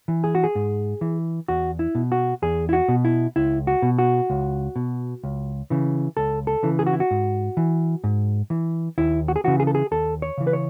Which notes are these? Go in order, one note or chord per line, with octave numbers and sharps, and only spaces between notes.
E3
G#4
F#4
G#4
G#2
E3
E2 F#4
E4
B2
F#4
E2 G#4
E4
F#4
B2
E4
C#2 E4
F#4
B2
F#4
C#2
B2
C#2
C#3 E3
C#2 A4
A4
C#3 E3
G#4
F#4
E4
F#4
G#2
E3
G#2
E3
D#2 E4
F#4
G#4
C#3 E3 F#4
G#4
A4
G#4
D#2 A4
C#5
C#3 E3
B4
C#5